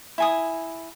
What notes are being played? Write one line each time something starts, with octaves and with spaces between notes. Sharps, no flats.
E4 G#5 D#6